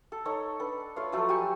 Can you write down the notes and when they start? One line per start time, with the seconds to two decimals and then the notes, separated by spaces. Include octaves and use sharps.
0.12 A4
0.25 D#4 A4 C#5
0.60 D4 A4 B4
0.96 A3 F4 C#5 F5
1.12 F3 F#3 A3 A4
1.29 F#3 G4 G#5 C#6